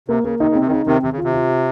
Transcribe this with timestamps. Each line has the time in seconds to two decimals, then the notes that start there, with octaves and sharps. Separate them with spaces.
0.08 C3 A#3
0.24 C#3 A#3
0.40 C3 D#3 D#4
0.50 C#3
0.55 C4
0.60 C3
0.67 D#3
0.70 C#3 D#4
0.86 C3 D#3 C4
1.03 C3 D#3
1.13 C#3
1.18 F4
1.24 C3
1.34 F4
1.50 F4